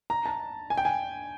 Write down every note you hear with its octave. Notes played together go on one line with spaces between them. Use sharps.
A#5
A5
G#5
G5
G#5